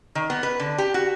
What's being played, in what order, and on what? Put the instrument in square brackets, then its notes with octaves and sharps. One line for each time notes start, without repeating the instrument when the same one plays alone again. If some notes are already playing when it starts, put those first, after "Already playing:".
[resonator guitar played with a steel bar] D#3
B3
B4
D3
G4
F#4